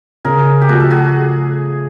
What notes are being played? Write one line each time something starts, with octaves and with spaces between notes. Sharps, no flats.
C#3 G#4 A#4
G4
F3 A3 F#4 G#4
A4
F#4 G#4